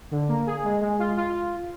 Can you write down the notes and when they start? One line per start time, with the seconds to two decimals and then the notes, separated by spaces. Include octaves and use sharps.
0.11 D3
0.28 A#3
0.47 G#4
0.64 G#3
0.82 G#3
0.99 F4
1.17 F4